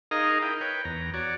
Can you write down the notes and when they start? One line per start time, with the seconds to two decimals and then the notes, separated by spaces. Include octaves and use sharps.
0.11 D#4 G#4 A#4 D#5 F5 A#5
0.42 E4 G5
0.61 B4 C#5 G5
0.85 E2 A#5
1.14 F#4 C#5 D5